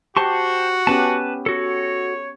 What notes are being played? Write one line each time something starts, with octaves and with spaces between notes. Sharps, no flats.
F#4 G4 C5 A5 C#6
B3 C#4 G4 B4 A5
F#4 A4 C#5